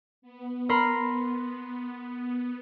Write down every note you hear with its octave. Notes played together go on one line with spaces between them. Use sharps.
B3
A#4 B5 C6